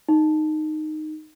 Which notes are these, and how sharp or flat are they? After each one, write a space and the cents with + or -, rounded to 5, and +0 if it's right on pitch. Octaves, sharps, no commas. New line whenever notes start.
D#4 -10